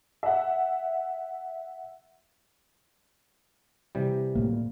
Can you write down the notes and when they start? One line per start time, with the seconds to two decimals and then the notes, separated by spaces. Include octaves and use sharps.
0.23 E5 F#5
3.95 C3 E3 G3
4.35 A2 A#3